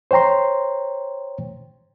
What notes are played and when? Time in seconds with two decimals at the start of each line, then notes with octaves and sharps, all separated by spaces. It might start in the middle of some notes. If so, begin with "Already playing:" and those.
0.11 C5 C#5 G5 A#5 C6